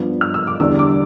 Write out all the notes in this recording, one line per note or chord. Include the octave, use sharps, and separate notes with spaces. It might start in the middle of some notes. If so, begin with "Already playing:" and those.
Already playing: G2 F3 B3 D4
F6
E6
D6
E2 D3 G3 D4 E6
D6